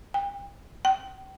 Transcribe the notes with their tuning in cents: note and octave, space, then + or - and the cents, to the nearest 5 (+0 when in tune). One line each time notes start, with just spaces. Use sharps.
G5 +35
G5 -35